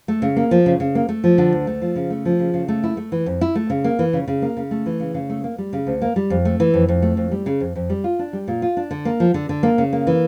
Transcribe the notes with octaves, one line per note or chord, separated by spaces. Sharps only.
A3
C#3
A#3
F3
C#3
C#3
A#3
A3
F3
D3
D2
A3
F3
C#3
A3
F3
C#3
C#3
A3
E4
A3
E3
F2
E4
A3
C#3
A#3
E3
C#3
C#3
A#3
C#3
A3
E3
C#3
C#3
A3
A#3
G3
C#3
D2
A#3
G3
F2
A3
E3
F2
F2
A3
F2
G3
C#3
F2
F2
G3
F4
D4
G3
A#2
F4
D4
D3
A#3
F3
D3
D3
A#3
C#3
A#3
E3